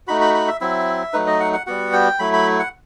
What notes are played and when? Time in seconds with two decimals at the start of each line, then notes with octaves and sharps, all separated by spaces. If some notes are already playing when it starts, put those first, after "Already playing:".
0.07 A3 D#4 F#4 B5
0.21 B5
0.34 B5
0.48 E5
0.61 F#3 C4 E4 E5
1.13 F#3 A3 D#4 B4
1.27 D#5
1.40 F#5
1.53 F#5
1.67 G3 B3 F#4 F#5
1.93 G5
2.19 F#3 A3 E4 B5
2.33 B5
2.59 F#5